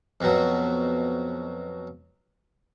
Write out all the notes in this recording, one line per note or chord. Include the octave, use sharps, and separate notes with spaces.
F2 B2 F#3